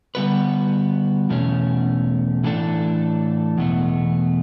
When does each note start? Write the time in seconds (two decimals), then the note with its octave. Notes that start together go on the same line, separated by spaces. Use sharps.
0.15 D3 G3 B3 F#4 B4
1.30 E2 B2 A3 C#4
2.44 A2 E3 A3 D4 A4
3.58 E2 B2 A3